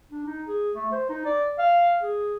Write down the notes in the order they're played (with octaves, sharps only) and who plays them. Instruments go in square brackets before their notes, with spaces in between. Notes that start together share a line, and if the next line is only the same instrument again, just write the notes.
[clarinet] D4
D#4
G#4
A3
C5
D#4
D5
F5
G#4